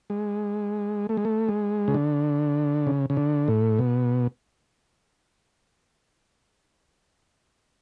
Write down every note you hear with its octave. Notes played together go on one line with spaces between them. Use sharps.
G#3
A3
G#3
A3
G#3
C#3
D3
C#3
C#3
D3
A2
B2